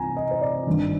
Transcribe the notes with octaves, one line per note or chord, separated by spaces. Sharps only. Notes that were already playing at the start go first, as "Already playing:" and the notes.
Already playing: C2 G#5 A#5
D#5
C5
D5
G#1 G2 D#3